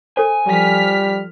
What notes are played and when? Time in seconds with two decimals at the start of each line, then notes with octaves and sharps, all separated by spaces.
0.17 A4 C5 G#5
0.47 F3 G3 F6 B6